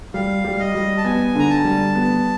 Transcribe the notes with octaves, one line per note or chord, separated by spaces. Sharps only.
G3 F5
G3
D#5
G3
A5
B3 G#5
D3 A#5
A5
G3
B3